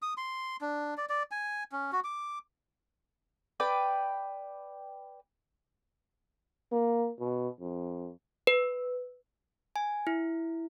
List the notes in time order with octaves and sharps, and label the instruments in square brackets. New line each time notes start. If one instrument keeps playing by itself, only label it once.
[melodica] D#6
C6
D4
D5
D5
G#5
C#4
F#4
D6
[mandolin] B4 D5 G5
[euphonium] A#3
B2
F2
[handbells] B4
[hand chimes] G#5
E4